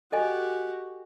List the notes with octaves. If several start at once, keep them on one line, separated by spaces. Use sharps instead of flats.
F#4 G4 A4 D#5 G#5